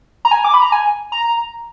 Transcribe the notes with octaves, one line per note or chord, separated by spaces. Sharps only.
A#5
G#5
D6
B5
A#5
G#5
A#5